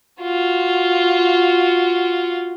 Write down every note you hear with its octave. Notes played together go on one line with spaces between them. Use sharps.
F4 F#4